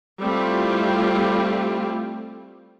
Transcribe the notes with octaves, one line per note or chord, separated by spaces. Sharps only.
G3 A3 C4 E4 F4 G4